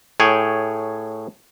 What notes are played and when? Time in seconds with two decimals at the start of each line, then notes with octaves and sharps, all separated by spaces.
0.20 A2 G#4 C#5 G5